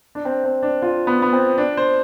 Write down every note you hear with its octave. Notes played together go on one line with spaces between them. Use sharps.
D4
C4
C4
D4
F4
B3
B3
C4
D4
C5